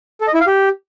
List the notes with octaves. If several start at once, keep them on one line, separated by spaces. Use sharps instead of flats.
A4
D#5
E4
F5
G4